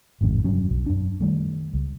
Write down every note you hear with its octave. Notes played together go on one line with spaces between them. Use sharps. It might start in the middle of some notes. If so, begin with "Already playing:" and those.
G#1 F2 A2 C#3
F1 G2 F#3 C#4
B1
F#2 D4
D#3 G3 A3
C#2